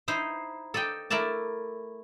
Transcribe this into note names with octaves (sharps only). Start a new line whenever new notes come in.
D#4 E4 C5
A4 D5 D#5 G5
A3 E4 A#4 D5 A5